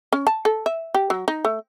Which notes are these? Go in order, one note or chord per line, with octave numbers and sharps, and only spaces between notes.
C#4
A5
A4
E5
G4
F#3
D#4
A3